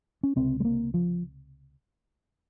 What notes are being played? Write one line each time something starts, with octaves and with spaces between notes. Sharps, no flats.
C#4
C#2 C3 C4
G#3
A#3
F3